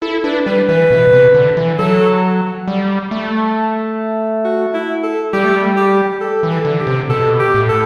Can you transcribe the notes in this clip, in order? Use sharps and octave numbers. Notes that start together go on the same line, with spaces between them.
E4 A4
D4 B4
G3 B4
E3 B4
B2
C3
D3
E3
F#3 A4
G3
A3
F#4
E4
A4
G3 G4
A3
G3
G4
A4
E3
A4
D3
G4
C3
B2 A4
G4
A2
A4